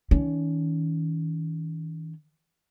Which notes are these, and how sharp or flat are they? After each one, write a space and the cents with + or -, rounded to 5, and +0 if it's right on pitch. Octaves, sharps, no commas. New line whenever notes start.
D#3 +45 C#4 +35